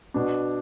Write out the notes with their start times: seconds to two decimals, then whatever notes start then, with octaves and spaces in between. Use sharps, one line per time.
0.14 B2 D4